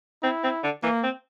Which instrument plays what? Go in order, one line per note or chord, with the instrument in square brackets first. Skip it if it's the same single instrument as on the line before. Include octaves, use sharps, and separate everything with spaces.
[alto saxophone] C4 [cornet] E4
[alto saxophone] C4
D3
[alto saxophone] E3 [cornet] A#3
[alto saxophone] C4